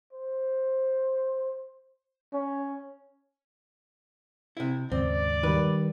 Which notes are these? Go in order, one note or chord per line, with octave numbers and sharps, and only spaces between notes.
C5
C#4
C3 E4
D#2 G#2 C#3 C4 D5
D#3 G3 B4